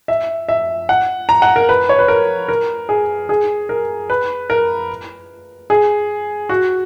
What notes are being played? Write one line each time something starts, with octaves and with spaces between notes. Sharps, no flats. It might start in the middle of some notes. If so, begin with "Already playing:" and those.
E5
E5
F#5
A#5
F#5
A#4
B4
C#5
B4
A#4
A#4
G#4
G#4
A#4
B4
A#4
G#4
F#4